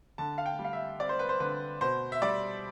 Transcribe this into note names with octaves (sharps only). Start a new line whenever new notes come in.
D3 A5
F5
G5
G3
F5
E5
C4 D5
C5
B4
C5
D3 B4
B2 C5
E5
G3 D5